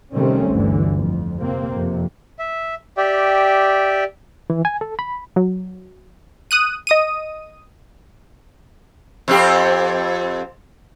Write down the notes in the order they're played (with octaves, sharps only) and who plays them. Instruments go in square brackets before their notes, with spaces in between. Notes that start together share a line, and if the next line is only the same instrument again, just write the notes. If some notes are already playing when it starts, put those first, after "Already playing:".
[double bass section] C3 D#3 G3 A3 C4 C#4
G1 D2 D3 E3
F2
C3 A#3 C4
F2 C3
[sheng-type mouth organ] E5
G4 D5 E5 G5
[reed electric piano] E3
G#5
A4
B5
[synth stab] F#3
D#6 F#6 D#7
D#5 D#6 D#7
[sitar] F2 C4 G4